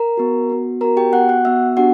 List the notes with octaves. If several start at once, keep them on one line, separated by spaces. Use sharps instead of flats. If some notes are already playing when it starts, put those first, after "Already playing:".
Already playing: A#4 A#5
B3 F#4
B3 F#4
B3 F#4 A#4 A#5
G4 G5
B3 F#4 F#5 F#6
F#5 F#6
B3 F#4 E5 E6
B3 D4 F#4 G4 F#5